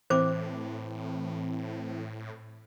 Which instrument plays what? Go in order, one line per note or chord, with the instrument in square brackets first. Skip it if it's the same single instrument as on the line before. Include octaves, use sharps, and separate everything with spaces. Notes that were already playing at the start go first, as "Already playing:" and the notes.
[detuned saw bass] A2 [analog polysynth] E3 C4 [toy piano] C5 D6